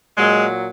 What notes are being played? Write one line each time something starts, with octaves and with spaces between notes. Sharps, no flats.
A#2 F#3 G#3